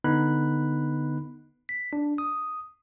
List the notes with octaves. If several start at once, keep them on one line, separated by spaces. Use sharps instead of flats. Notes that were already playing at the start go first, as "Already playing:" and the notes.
D3 B3 D#4 B5 F#6
B6
D4
D#6